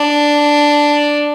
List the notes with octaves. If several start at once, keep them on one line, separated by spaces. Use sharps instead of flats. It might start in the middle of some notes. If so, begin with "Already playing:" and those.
Already playing: D4